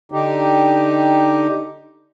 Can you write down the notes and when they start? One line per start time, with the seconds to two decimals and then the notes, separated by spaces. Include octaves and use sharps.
0.12 D3 D#4 G4